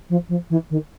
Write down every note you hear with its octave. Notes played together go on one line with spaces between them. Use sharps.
F3
F3
E3
D#3